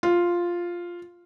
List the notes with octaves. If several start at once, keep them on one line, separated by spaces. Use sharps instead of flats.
F4